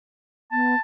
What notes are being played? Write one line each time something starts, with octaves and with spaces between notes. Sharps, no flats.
B3 A5